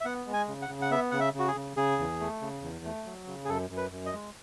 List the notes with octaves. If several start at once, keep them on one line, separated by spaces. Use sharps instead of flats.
E5
B3 F#5
G#3
G#5
C#3
F#5
C#3
F#5
B3 E5
C#3 F#5
E5
C#3
F#4
G#4
C#3
C#3 G#4
E2
A3
C#3
E2
A3
F#3
C#3
G#4
F#2 A4
F#2
B4
F#2
D#5
G#3